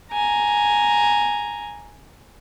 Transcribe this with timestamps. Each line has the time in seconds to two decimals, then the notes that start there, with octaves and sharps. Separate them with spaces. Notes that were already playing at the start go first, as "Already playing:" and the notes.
0.12 G#5 A#5